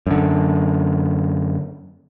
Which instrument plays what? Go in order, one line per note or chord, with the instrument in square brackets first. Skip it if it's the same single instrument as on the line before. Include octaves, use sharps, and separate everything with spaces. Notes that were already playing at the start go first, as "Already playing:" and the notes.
[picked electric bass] F#2 D3